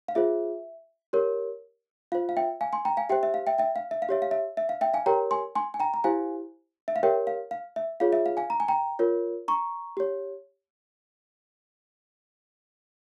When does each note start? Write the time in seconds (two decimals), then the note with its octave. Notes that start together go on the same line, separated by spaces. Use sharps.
0.08 F5
0.15 F4 G#4 C5 E5
1.13 G4 A#4 C#5
2.12 F4 F5
2.15 C5
2.29 F5
2.37 E5 G5
2.61 F5 G#5
2.73 G#5 C6
2.85 G5 A#5
2.97 F5 G#5
3.09 G4 C5 E5 G5
3.23 E5
3.34 F5
3.47 E5 G5
3.58 E5 G5
3.76 F5
3.91 E5
4.02 F5
4.09 G4 C#5 E5
4.22 F5
4.31 E5
4.57 E5
4.69 F5
4.81 E5 G5
4.94 F5 G#5
5.06 G4 A#4 C#5 G5 A#5
5.31 G#5 C6
5.55 G#5 C6
5.74 G#5
5.80 G5 A#5
5.94 A#5
6.04 E4 G4 C5 F5 G#5
6.88 E5
6.96 F5
7.03 G4 A#4 C#5 E5 G5
7.27 F5
7.51 F5
7.76 E5
8.00 F4 G#4 C#5 F5
8.13 E5
8.26 F5
8.37 F5 G#5
8.50 A#5
8.60 G#5
8.68 G5 A#5
8.99 F4 A#4 C#5
9.48 A#5 C#6
9.97 G4 C#5